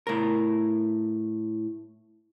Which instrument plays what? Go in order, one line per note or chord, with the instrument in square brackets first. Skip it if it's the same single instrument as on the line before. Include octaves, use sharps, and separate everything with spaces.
[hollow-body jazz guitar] A2 A#4